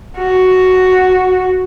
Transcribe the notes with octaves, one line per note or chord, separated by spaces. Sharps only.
F#4